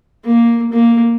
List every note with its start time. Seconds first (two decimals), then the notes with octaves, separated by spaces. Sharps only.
0.24 A#3
0.72 A#3